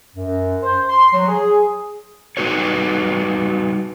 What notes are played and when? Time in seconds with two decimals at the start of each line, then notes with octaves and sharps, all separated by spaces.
0.16 F#2
0.63 C5
0.89 C6
1.14 F#3
1.28 G#4
2.37 G3 A3 D#4 F#4 B4 C#5